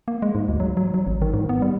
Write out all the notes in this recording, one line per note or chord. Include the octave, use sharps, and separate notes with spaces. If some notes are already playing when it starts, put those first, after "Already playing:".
A#3
G#3
G#2
D2
F#3
F#3
F#3
G#1
D#3
G#2
B3
G3